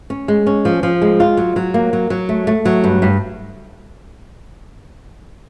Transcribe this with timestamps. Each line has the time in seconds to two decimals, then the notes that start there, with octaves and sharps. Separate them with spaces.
0.10 C#4
0.28 G#3
0.47 C#4
0.65 F3
0.83 F3
1.02 G#3
1.20 F4
1.37 F#3
1.56 F#3
1.74 A#3
1.93 F#3
2.10 F#3
2.29 A3
2.47 A3
2.65 F#3
2.84 G2
3.02 G2